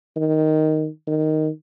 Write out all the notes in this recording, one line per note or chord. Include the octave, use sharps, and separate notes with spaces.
D#3
D#3